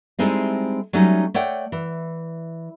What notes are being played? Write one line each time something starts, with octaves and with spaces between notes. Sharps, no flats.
G3 G#3 C4 D#4 E4 A4
F#3 G3 A3 C#4 D#4
A3 C#5 D5 F#5 G5
E3